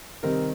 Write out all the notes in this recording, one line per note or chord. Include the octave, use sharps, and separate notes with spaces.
C3 D#3 G3 C4 D#4 A#4